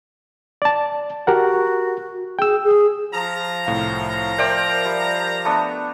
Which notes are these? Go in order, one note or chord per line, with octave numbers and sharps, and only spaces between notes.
D5 A5
F#4 G4 A#4 F#5
G#4 G5 E6
G#4
F3 A#5
C2 A2 F5
A#4 C5 D5 E5 G5 D6
G3
A3 B3 D4